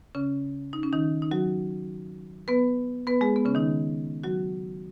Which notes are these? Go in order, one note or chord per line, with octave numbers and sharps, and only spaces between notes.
C#3 C#4
D#4
C#4
D#3 D#4
D#4
F#3 F#4
B3 B4
B3 B4
G#3 G#4
B3
C#3 C#4
D#3 D#4
F#3 F#4